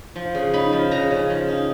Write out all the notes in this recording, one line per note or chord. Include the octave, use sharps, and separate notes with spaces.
F3
C#3
D#4 B5
F3
C#3 A#5
C#3
F3
D#4